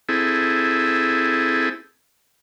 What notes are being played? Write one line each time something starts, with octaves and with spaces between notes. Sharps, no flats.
C4 E4 G#4 A4